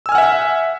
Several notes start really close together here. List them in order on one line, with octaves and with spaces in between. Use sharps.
E6 G#5 F6 F#5 E5